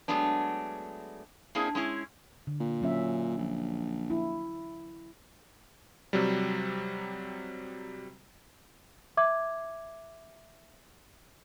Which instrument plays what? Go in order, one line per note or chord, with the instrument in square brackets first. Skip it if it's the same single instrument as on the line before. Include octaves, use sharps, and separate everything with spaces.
[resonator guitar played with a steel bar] F#3 G#3 A3 B3 D4
A#3 C4 D4 E4 G#4
G#3 C#4 E4 G#4
[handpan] D3
[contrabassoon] A#2
[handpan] F#3 C#4 E5
[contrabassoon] A#1
[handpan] E4
[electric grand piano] C3 F#3 G3
[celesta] E5 D6 G#6